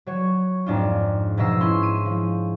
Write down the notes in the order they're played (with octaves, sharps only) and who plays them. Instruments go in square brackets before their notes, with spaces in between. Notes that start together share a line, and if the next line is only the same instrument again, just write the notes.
[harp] F#3 C#5
F2 G#2 D4 F4
G#2 B2 F3 D#5 E6 C7
C#4 E4 C6 E7
D#7
F3